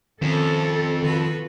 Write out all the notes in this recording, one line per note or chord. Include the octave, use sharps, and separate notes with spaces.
F2 C3 D#3 C#4 A4
D#3 F4 F#4 B4